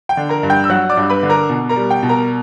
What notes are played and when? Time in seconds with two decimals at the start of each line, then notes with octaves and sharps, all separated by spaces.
0.09 G5
0.17 D3
0.29 A#4 A#5
0.43 G2
0.50 G5 G6
0.64 E6
0.70 F#3 F#5 F#6
0.89 D5 D6
0.97 G2
1.10 B4 B5
1.23 D3
1.30 A#4 A#5
1.50 B2
1.69 A#4 A#5
1.76 G3
1.90 G5
2.03 B2
2.09 A#4 A#5